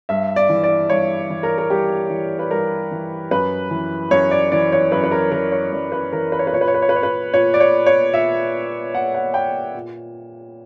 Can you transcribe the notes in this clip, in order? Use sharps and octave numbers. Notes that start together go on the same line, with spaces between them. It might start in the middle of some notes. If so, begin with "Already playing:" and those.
G2 E5
D5
E3
D5
G2 C#5
E3
A#4
A#4
G2 G4
E3
B4
G2 A#4
E3
F#2 B4
E3
F#2 C#5
D5
E3 D5
C#5
F#2 B4
B4
A#4
E3 A#4
C#5
F#2 D5
B4
E3 A#4
B4
C#5
B4
A#2 C#5
B4
C#5
B4
C#5
B4
C#5
B4
A#2 C#5
D5
C#5
C#5
A#2 E5
A#2 F#5
F#5
G5
A#2